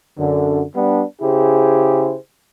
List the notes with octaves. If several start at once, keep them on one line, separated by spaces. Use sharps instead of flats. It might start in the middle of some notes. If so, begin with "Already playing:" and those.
F#2 D3
G3 B3 D4
C#3 E4 G4 G#4 C5